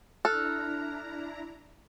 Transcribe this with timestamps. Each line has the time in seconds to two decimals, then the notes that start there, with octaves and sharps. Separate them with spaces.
0.25 D4 E4 A4 A#5 F6 F#6